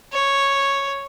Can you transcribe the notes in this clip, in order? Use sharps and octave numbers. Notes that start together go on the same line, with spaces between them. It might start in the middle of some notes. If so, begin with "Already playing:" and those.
C#5